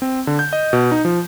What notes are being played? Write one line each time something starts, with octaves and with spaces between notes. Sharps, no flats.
C4
D3
G6
D#5
B2
D#4
F3